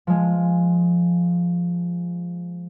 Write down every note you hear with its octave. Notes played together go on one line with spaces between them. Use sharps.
F3 G#3